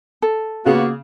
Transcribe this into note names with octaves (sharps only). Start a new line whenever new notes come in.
A4
C#3 A#3 B3 F4 F#4 G#4